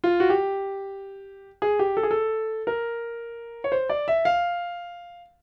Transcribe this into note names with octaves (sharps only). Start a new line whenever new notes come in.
F4
F#4
G4
G#4
G4
A4
G#4
A4
A#4
C#5
C5
D5
E5
F5